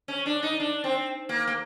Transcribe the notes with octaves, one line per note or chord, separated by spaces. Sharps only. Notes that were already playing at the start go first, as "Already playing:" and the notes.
C#4
D4
D#4
D4
C4
A#3
A#3